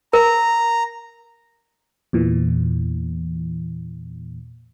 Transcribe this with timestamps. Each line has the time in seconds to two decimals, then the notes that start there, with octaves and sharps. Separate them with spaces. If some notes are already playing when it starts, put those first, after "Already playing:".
0.13 A#4 A#5
2.13 E2 A#2 E3